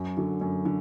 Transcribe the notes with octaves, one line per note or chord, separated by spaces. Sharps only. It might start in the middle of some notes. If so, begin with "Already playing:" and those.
Already playing: F#2
D3 F#3
F#2
D3